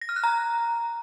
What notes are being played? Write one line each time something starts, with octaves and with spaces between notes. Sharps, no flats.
A#6
F6
F#6
A#5